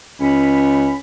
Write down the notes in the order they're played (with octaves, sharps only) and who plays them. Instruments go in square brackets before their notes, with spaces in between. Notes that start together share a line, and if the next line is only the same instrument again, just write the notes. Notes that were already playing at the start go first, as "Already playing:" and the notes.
[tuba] C#2 [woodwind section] C#4 B5